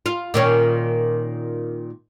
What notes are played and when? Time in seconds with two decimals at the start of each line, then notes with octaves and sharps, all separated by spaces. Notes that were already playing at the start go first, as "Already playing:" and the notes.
0.06 F4
0.34 A#2 D#3 C#4